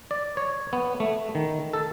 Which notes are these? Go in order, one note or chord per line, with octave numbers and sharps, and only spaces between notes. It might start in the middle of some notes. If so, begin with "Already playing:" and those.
D5
C#5
B3
A3
D#3
A4